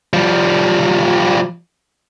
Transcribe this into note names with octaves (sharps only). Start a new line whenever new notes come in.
F3 G3